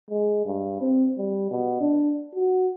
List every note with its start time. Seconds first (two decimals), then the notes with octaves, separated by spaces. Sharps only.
0.10 G#3
0.45 G2
0.81 C4
1.18 G3
1.51 B2
1.80 D4
2.35 F#4